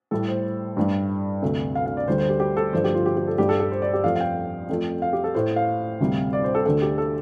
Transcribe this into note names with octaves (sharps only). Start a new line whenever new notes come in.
A2 G3 A4
C5
G2 G3
D2 C3 A3
F5
F5
D5
D2 D3 G3 C5
C5
G4
G4
A4
G2 F3 A3 C5
G4
F4
G4
G4
A4
G2 G3 G4
A4
A4
C5
D5
G4
F2 F3 A3 F5
F5
G5
F2 F3 A3
F5
G4
A4
A2 A3 C5
F5
D2 C3 G3
D5
C5
A4
D2 D3 A3 A4
G4
A4